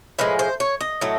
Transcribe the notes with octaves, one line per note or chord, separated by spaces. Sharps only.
A2 F3 G#3 B4
C5
C#5
D#5
A2 F#3 A3